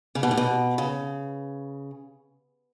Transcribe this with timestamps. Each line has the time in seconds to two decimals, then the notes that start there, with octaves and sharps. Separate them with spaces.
0.15 C#3
0.23 B2
0.31 A2
0.37 B2
0.78 C#3